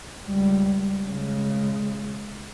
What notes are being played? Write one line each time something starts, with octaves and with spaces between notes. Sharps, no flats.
C#2 G3
C#3 G#3